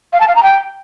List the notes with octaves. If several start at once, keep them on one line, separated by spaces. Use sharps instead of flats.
F5
A5
F5
A#5
G5